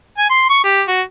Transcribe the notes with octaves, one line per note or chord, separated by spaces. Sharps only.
G#5
C6
C#6
G4
F#4